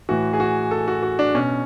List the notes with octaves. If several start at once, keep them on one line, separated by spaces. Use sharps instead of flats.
A2 E3 F#4
G#4
F#4
A4
F#4
F#4
D4
B2 C#4